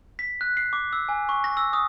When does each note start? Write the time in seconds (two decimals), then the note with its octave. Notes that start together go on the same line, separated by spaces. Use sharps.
0.19 B6
0.41 F#6
0.57 C7
0.73 D6
0.93 E6
1.09 G#5
1.29 C#6
1.44 A#6
1.57 E6
1.73 D#6